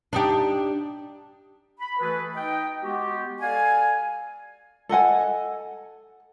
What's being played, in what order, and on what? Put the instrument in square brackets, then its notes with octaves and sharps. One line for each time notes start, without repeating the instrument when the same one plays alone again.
[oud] D4 D#4 G4
[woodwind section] B5
E3 A3 F#4 G#4 A4 B4
D#4 D#5 G5
G#3 B3 F#4 G4
A4 D5 F5 G#5
[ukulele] A4 D#5 F#5 G#5